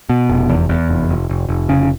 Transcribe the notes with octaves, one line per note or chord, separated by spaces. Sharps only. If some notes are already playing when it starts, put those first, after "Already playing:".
B2
F1
E2
E2
F1
F1
F1
F1
C#3